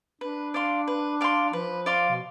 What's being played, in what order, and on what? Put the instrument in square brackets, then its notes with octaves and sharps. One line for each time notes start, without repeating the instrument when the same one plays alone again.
[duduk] D4 [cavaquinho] B4
[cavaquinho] D5 F5 C6
B4
D5 F5 C6
[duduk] F3 [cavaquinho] B4
[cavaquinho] D5 F5 C6
[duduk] B2